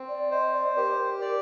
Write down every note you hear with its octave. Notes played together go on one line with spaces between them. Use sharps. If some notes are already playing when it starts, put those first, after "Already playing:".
Already playing: C4
D5
C5 D#5
D5
G4 A#4
D5